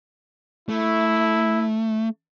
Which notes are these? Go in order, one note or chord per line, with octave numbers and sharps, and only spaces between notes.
A3 E4